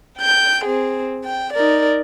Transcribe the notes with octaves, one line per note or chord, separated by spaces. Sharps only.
G5 G6
C4 G#4
G5
D#4 A#4 D5